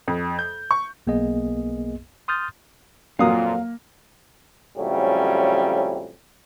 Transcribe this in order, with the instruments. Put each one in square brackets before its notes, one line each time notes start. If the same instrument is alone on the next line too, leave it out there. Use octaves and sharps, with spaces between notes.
[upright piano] F2
G6
C#6
[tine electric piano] B1 A#3 B3 G#4 D#5
C6 D#6 F6 G6 A6
[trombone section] F2 A#2 [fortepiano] F#3 D#6 [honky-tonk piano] A#3 [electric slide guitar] F5
[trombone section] F2 A2 C#3 F#3 G3 C#4